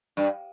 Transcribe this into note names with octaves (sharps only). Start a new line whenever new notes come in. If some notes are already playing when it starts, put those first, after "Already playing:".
G2